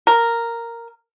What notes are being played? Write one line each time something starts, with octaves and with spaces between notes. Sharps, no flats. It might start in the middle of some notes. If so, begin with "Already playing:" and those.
A#4